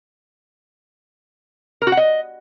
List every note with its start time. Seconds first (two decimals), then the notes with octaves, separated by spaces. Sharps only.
1.82 A#4
1.87 F#4
1.92 F#5
1.97 D#5